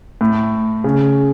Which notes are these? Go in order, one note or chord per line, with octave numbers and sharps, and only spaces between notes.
A2
C#3